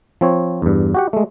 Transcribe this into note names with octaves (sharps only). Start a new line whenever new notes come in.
F3 C4 C#5
E2 G2
F#4 G4 F#5
G#3 A3